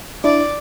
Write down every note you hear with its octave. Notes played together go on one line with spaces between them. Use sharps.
D4 E4 D5